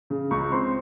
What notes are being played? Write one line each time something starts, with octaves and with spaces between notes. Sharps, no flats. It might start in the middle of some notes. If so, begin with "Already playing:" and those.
C#3
C#2 C#6
C4 C6